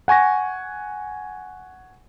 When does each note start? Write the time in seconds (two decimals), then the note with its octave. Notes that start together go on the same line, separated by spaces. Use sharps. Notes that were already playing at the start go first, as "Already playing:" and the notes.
0.08 F#5 G#5 C#6 A#6